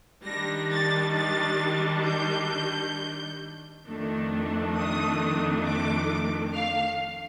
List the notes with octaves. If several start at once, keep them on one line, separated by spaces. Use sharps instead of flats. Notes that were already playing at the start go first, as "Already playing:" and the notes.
D#3 G3 D4 A#6
A6
A6
G6
F2 D#3 A3 D4
D#6
D6
F5